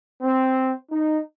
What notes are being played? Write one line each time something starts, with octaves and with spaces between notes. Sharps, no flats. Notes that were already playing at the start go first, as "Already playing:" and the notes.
C4
D#4